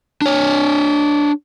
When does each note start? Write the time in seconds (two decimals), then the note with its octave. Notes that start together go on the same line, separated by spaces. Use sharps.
0.22 D4 C#5